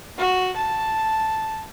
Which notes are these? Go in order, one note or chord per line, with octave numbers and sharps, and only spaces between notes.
F#4
A5